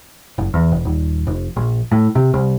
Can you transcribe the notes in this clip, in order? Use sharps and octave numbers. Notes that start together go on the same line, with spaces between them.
F#1
E2
E1
D#1
F1
A#1
A2
C3
C2